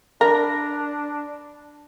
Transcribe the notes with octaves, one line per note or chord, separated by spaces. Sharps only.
D4 A#4 B5 A#6